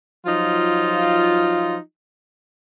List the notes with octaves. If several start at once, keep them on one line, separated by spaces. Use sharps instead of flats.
F3 F#3 D#4 F4